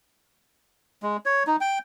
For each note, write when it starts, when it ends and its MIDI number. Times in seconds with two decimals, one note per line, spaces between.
1.03 1.17 56
1.26 1.43 73
1.47 1.56 63
1.61 1.79 79